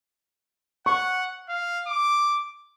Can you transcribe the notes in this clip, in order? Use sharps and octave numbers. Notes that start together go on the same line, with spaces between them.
F#5 C#6
F5
D6